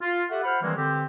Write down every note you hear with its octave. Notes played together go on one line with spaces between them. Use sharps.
F4
G4 A4 E5 F#5
C5 F#5 B5 F6
D#3 E3 G3 G#3 A#3 C4
D3 C4 G4